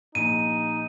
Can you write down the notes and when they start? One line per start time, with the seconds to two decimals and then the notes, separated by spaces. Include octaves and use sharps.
0.15 A#1 D#4 D#7